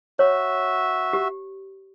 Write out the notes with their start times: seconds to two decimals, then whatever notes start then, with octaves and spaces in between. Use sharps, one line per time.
0.19 F#4 C#5 E5
1.13 G4